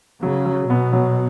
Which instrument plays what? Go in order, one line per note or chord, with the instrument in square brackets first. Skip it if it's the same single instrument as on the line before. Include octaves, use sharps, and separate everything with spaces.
[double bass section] C#3 [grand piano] F#3
[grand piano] F#3
[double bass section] B2 [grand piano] B3
[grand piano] F#3